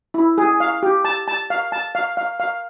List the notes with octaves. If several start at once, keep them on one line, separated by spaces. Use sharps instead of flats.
E4
G#4
F5
G4
A5
A5
F5
A5
F5
F5
F5